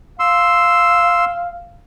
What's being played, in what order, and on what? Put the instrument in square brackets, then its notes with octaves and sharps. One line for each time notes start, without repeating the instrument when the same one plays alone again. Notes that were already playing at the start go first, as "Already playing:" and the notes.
[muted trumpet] F5 [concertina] C6 E6